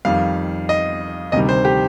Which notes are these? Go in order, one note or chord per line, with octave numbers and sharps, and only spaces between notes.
F2 D#3 G3 F5
D#5
D2 C3 D#3 G3 D#5
C5
G4